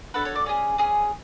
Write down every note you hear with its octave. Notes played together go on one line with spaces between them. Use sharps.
D4 F#4 A4 B4
C#5
D5
C#4 G#4
C#4 G#4